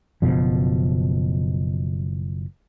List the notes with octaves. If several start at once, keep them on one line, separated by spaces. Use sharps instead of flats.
F#1 C#2 B2 F3